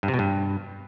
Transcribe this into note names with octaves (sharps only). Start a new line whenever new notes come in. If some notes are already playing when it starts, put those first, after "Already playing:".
G2
C3
B2
G2